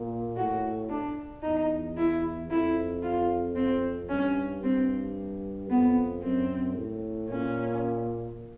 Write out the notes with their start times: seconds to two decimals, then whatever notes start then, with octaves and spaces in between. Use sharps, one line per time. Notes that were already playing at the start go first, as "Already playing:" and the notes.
Already playing: A#2
0.37 A2 F#4
0.89 D4
1.43 E2 D#4
1.97 E4
2.50 F2 E4
3.02 F4
3.56 C4
4.09 G2 C#4
4.63 G2 C4
5.69 F2 B3
6.22 F#2 C4
6.76 A2
7.29 A#2 C#4